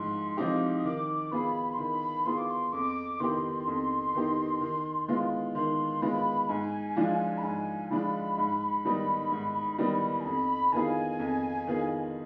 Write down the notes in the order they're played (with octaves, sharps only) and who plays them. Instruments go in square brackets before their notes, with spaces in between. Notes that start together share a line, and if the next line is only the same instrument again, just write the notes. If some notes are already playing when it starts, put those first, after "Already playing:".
Already playing: [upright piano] G#2 F3 D#4 [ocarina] C6
[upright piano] F3 C4 D#4 G4 [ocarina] D6
[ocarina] D#6
[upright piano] D#3 [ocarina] D6
[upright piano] B3 F4 G#4 [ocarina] B5
[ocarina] C6
[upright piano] D#3 [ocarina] B5
[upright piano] B3 F4 G#4 [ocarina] C6
[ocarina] D6
C6
[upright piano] F2 [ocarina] D6
[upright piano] D#3 B3 D#4 G4 [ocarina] C6
[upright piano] F2
D#3 B3 D#4 G4
D#3
G#3 B3 F4
[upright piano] D#3 [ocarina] C6
[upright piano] G#3 B3 F4 [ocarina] B5
[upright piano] G#2 [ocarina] G#5
[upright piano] F3 G#3 D4 F4
[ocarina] B5
[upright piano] G#2 [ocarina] G#5
[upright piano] F3 G#3 D4 F4 [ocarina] B5
[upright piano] G#2
D#3 G3 B3 D#4
G#2
D#3 G3 B3 D#4
[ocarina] G#5
[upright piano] F2 [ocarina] B5
[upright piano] D#3 B3 F4 G#4 [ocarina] G#5
[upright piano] F2
D#3 B3 F4 G#4